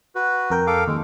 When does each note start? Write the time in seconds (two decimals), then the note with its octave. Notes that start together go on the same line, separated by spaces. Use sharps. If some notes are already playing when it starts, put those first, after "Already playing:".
0.15 F#4 B4
0.50 F2 A#4 G5
0.67 A4 F5 D6
0.88 D#2 G#3